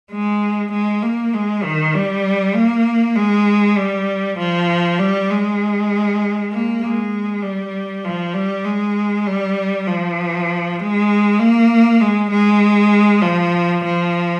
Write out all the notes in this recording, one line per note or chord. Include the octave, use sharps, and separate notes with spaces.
G#3
G#3
A#3
G#3
D#3
G3
A#3
G#3
G3
F3
G3
G#3
A#3
G#3
G3
F3
G3
G#3
G3
F3
G#3
A#3
G#3
G#3
F3
F3